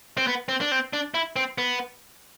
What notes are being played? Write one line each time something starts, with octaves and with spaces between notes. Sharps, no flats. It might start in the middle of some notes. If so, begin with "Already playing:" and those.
C4
B3
C4
D4
C4
D4
E4
C4
B3